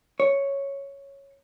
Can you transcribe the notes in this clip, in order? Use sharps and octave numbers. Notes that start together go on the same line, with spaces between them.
C#5